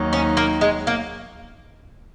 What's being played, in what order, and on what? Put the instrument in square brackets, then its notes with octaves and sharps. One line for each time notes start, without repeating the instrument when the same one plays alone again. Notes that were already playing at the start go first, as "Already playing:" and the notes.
Already playing: [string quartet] D#2 D#3 F#3 D#4
[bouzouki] C#4
A#3
G#3
A#3